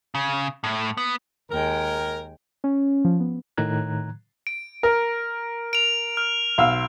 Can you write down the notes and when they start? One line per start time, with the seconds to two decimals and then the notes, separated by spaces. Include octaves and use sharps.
0.15 C#3
0.64 A2
0.97 B3
1.50 D#2 G#3 A#4 G5
2.64 C#4
3.05 F3
3.20 B3
3.58 A2 D#3 A#5 F#6 G#6
4.47 D7
4.83 A#4
5.73 D7 F7
6.17 F6
6.58 B1 F5 E6